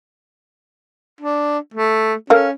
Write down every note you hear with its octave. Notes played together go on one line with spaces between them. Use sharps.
D4
A3
C#4 A4 A#4 F5